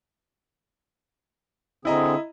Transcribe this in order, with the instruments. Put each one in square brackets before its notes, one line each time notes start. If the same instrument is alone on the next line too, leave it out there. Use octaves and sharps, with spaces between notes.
[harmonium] D3 C4 G#4 [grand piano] E4 D#5 A#5